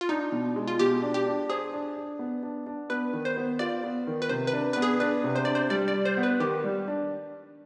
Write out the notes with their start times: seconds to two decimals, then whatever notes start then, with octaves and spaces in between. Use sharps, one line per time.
0.01 F4
0.09 D4 D#4
0.32 B2
0.56 G#3
0.68 F4
0.79 B2 G4
1.02 D4
1.14 G4
1.26 D4
1.50 G#4 C5
1.73 D4
1.96 D4
2.19 B3
2.43 D4
2.66 D4
2.90 B3 B4
3.13 D#3
3.25 C5
3.37 B3
3.59 F4 D5
3.83 B3
4.07 D#3
4.22 B4
4.29 C3 C5
4.47 B4
4.53 D4
4.73 B3 B4
4.82 G#4
5.00 D4 B4
5.24 C3
5.36 C5
5.45 D4 D5
5.55 C5
5.70 G3 D5
5.88 D5
5.94 G3
6.05 C5
6.17 B3
6.23 B4
6.40 D#3 G4
6.64 G3
6.88 D4